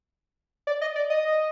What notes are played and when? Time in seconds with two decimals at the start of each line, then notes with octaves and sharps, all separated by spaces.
0.67 D5
0.81 D#5
0.96 D5
1.10 D#5